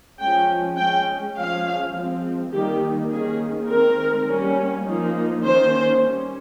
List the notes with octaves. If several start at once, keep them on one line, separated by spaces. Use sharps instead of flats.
F3 G#3 C#4 G5
G#3 C#4 G5
F3 G#3 C#4 F5
F3 G#3 C4
D#3 G3 A#3 D#4 G4
D#3 A#3 C#4 G#4
D#3 G#3 C4 A#4
G3 A#3 C#4
F3 A#3 D#4
D#3 A#3 C#4 C5
G3 C#4